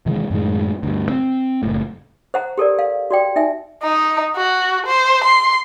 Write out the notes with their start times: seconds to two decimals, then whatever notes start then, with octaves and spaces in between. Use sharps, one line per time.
0.06 C3 D#3 E3 G#3
0.30 F#2 A2 D#3 G#3
0.83 D2 G2
1.09 C4
1.63 F#1 A2
2.34 C5 F#5 A#5
2.58 G4 A4 A#4 D5
2.79 F5
3.11 F#4 D5 G5
3.36 D#4 E5 G#5
3.83 D#4
4.36 F#4
4.86 C5
5.24 C6